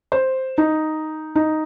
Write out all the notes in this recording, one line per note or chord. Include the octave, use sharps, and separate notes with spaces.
C5
D#4
D#4